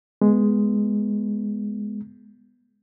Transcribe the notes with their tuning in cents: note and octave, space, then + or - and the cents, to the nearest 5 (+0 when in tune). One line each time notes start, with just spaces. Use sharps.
G#3 +0 B3 +0